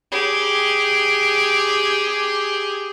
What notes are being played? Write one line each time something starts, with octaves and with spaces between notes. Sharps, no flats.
G4 G#4